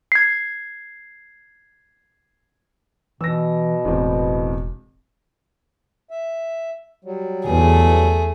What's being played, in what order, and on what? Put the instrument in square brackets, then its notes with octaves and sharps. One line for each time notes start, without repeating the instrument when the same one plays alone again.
[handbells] G#6 C7
[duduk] B2 [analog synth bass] E3 [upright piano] E6 A#6
[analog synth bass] E1 [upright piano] E2 A2 C4
[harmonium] E5
F#3 G3
[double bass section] E2 [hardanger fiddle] A3 G#4